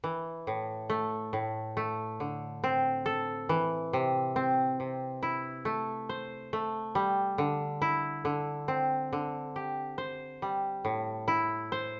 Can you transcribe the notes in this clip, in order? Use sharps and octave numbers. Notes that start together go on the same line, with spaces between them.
E3
A2
A3
A2
A3
D3
C4
A4
E3
C3
C4
C3
E4
A3
C5
A3
G3
D3
E4
D3
C4
D3
G4
C5
G3
A2
E4
C5